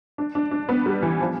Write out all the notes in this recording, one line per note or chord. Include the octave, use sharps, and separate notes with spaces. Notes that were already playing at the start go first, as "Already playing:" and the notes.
D4
D4
D4
B3
G3
E3
F3